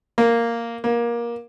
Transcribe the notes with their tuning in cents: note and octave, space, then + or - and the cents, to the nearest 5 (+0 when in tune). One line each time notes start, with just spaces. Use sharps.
A#3 -5
A#3 +20